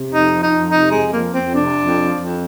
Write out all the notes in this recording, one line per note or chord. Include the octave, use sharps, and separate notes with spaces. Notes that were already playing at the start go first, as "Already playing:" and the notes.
Already playing: C3
F2
D#4
F3
D#4
F2
C3 D#4
F2 G#3
F3 A#3
F2 C4
C3 D4
F2
F3
F2